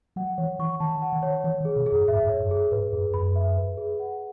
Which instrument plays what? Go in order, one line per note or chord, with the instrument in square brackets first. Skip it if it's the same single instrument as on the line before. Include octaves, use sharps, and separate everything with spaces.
[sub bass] F#3 [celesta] F#5
[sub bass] E3 [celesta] C#5
[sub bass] E3 [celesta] C#6
[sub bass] D#3 [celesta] A5
[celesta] F#5
[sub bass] D#3
[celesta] C#5
[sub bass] E3 [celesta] C#5
[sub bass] D#3
[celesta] G#4
[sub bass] B2
[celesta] G#4
[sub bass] F#2
[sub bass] G#2 [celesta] E5
[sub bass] F#2
G#2
[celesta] C#5
[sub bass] F#2
[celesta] G#4
[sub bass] G#2 [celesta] B4
[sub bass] F#2 [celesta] G#4
[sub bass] F#2 [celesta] B5
[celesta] E5
B4
G#4
F#5